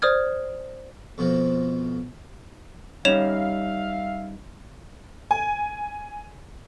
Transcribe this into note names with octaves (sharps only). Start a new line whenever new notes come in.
C5 D5 D#6 F6 G#6
F2 B2 F3
G3 C#4 D#4 C#5 E5 F5 E7 F7
G#5